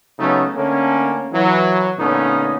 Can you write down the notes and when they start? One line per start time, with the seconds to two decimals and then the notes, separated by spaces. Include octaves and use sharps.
0.19 C#3 F#3 A3 B3 C#4 D#4
0.56 D3 A3 A#3 C#4
1.32 E3 F#3
1.99 A#2 D3 A3 B3 C#4 D#4